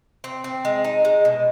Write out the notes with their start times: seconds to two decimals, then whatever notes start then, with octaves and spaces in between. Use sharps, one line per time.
0.24 C4
0.44 C4
0.65 G#3
0.84 D#4
1.05 G#3
1.25 B2